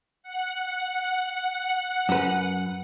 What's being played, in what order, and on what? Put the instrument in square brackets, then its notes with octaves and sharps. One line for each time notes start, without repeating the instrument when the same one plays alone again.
[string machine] F#5
[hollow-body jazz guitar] F#2 B4